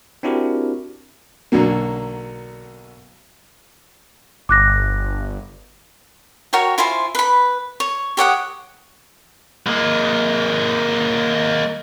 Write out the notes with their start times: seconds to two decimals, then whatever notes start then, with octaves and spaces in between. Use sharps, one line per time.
0.23 C4 D4 E4 F#4 G4 A#4
1.52 B1 D3 F#3 A#3
4.49 G1 D6 F#6 A#6
6.53 F#4 A#4 C#5 G5
6.78 E4 F4 C5 G#5
7.15 B4 B5
7.80 C#5
8.17 G4 C#5 F#5 D#6
9.67 G#3 A#3